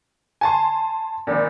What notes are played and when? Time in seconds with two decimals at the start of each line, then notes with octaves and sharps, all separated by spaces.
0.41 G#5 A5 C6
1.27 G#1 A#2